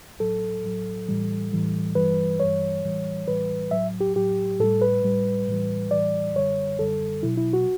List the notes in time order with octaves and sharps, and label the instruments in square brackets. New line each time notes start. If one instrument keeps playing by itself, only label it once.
[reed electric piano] A2 F#3 A4
A2 F#3
A2 E3 G3
A2 E3 G3
G2 E3 G3 B4
G2 E3 G3 C#5
A2 E3 G3
A2 E3 G3 B4
A2 F#3 E5
G4
A2 F#3 G4
A2 G3 A4
B4
A2 G3
A2 E3 G3
A2 E3 G3 D5
F#2 D3 G3 C#5
F#2 D3 G3 A4
B2 F#3 E4
E4
F#4